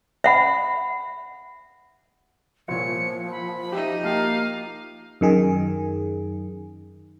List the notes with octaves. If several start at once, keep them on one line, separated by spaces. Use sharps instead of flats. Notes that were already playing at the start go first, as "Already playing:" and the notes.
E5 F#5 B5
C2 A#2 F3 C#5 C#7
B5
D#4 G4 D#5 E5
F3 A#3 F4 G4 F5
F#2 D#3 G#4